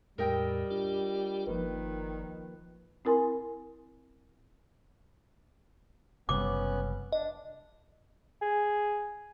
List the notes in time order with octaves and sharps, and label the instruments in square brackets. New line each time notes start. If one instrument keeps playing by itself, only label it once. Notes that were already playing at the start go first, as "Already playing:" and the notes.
[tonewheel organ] E2 A2 [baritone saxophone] G3 [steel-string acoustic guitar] A#4 D#5 G5
[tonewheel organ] D4 F4 G4
[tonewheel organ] G1 [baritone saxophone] D#3 [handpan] F3 A#3 B4
[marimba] C4 E4 A#4 G#5 C6
[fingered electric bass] F#1 C3 G3 [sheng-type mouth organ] B3 C#4 F#6 [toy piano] D6
[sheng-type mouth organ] D4 [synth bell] D#5
[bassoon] G#4